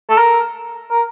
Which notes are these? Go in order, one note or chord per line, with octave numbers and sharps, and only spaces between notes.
A4
A#4
A#4